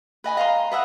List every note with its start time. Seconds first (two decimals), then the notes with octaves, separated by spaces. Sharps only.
0.24 B4 D#5 G#5 B5
0.37 D#5 F5 A#5 C6
0.72 B4 D#5 E5 F#5